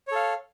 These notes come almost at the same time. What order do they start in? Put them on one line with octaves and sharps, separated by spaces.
C#5 A4 F5